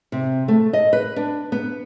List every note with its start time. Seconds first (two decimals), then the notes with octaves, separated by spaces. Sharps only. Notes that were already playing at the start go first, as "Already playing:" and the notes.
0.12 C3
0.48 A3
0.73 D#5
0.93 B4
1.16 D4
1.52 B3